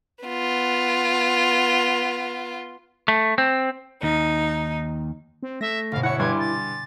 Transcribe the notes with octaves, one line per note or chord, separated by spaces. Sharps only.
B3 F4
A3
C4
D#2 D#4
C4
A3 E5 A#6
G1 B2 F5
E4 C#5 F#5 C#7
G2 G#5 C6 D6 G#6
A6